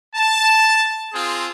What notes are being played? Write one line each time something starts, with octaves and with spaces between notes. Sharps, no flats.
A5
C4 F4 G#4